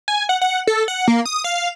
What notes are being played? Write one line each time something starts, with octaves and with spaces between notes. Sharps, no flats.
G#5
F#5
F#5
A4
F#5
A#3
D#6
F5